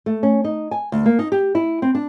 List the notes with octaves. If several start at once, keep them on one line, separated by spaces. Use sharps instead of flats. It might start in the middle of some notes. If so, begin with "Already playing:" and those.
A3
C#4
D#4
G#5
D2
A#3
D#4
G4
E4
C4
D4